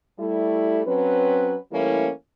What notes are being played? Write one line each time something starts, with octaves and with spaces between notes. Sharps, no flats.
G3 A3 E4
F#3 C4 C#4 B4
E3 G3 A3 A#3 C#4 E4